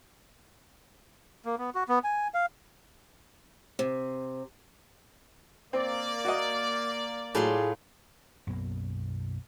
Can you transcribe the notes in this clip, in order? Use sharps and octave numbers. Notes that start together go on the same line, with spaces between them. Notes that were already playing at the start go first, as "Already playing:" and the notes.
A#3
B3
F#4
B3
G#5
F5
C3
A#3 C4 D5
F#4 D#5
A2 F#3 F4 G#4 C6
B1 F#2 B2 A#3